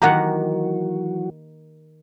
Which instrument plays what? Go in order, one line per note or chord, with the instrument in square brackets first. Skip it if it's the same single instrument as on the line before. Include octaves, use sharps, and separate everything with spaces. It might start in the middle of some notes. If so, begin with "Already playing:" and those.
[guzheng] D#3 A#3 G4 [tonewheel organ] E3 F#3 F#4 [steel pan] F#5 A#5